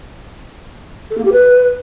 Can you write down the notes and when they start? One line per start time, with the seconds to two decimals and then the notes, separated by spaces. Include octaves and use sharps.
1.10 A4
1.17 A#3
1.25 G4
1.32 B4